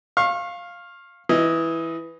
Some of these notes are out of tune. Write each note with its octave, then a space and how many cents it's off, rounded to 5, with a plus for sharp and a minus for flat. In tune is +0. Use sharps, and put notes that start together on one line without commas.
F5 +0 C#6 -35
E3 +0 D#5 +15